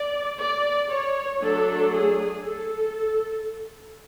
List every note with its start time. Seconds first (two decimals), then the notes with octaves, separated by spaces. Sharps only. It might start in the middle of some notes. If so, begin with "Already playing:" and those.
Already playing: D5
0.40 D5
0.91 C#5
1.41 F#3 A3 D4 A4
1.92 G#4
2.44 A4